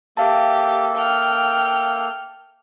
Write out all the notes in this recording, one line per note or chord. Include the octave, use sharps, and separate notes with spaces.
A#3 G4 A4 E5 F5 A5
G5 F6